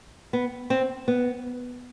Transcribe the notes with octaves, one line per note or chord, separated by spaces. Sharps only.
B3
C4
B3